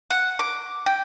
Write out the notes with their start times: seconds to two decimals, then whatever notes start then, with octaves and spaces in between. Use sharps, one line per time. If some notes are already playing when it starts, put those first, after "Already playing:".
0.10 F#5
0.39 D6
0.86 G5